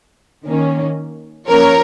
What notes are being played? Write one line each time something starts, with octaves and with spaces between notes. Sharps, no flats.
D#3 A#3 C#4
F3 A#3 C#4 A#4 C#5